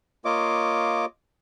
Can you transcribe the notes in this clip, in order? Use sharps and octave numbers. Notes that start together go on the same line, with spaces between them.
A#3 F4 C#5 D#5 D6